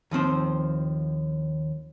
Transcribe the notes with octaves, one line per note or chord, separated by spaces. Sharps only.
D#2 F3 C4 C5